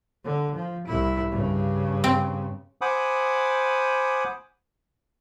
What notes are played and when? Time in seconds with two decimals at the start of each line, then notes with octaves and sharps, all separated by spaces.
0.24 D3
0.55 F3
0.87 C2 E4
1.31 G2 C#3
2.04 C4
2.81 C5 F#5 G#5 B5 D6 D#6